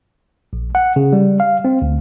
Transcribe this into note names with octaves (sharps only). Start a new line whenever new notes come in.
A#1
F#5
C#3
G3
F5
C4
D2